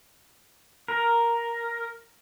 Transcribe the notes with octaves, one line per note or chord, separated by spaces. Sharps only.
A#4